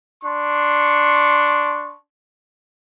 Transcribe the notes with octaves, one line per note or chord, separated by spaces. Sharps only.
D4 C6 C#6